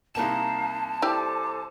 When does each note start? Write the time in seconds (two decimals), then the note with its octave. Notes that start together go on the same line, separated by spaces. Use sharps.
0.15 C2 A#3 D#4 F5 A5 A#5 E7
1.02 E4 G4 A4 C5 D5 D6